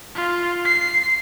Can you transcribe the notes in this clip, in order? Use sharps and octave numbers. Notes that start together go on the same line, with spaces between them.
F4
C7